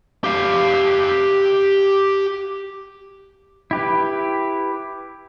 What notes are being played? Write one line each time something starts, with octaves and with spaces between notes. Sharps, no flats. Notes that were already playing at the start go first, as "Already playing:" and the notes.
G4 F5
E4 G4 B4